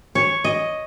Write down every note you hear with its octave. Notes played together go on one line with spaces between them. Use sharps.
C#5
D#5